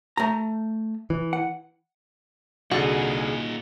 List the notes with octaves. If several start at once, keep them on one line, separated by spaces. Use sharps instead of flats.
A3 A#5
E3
F#5
C2 A#2 D3 D#4 F#4 G#4 A6